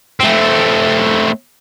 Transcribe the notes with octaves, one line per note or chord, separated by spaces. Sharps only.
A3 C4